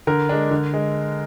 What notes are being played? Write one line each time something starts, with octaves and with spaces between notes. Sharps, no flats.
D3 A#4
G#3 D4
D3
G#3